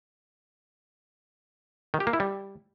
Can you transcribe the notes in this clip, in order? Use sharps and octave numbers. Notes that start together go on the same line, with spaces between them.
D#3
G4
A#3
E4
G3